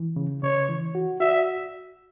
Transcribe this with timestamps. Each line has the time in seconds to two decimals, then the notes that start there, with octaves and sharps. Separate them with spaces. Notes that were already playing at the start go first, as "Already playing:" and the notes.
Already playing: E3
0.16 C#3
0.43 C#3 C#5
0.69 E3
0.95 F#4
1.20 F#4 E5